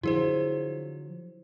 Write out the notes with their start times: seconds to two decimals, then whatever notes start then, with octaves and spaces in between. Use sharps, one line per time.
0.03 D3 F3 F#3 E4 G#4 C5